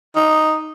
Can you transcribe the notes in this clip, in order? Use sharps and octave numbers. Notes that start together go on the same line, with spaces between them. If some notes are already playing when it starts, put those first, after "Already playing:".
D#4